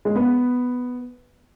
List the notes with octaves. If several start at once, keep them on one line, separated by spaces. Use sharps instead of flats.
G#3
B3